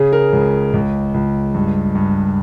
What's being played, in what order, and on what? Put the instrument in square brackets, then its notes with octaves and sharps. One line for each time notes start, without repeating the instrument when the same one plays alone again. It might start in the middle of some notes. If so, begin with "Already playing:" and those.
Already playing: [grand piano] C#3 G#4
A#4
C#2
C#2
C#2
G2
G2